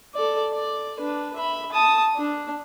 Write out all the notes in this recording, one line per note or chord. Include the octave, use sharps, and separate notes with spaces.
A4 D5
D5
D4 B4
E5 B5
A5 D#6
D4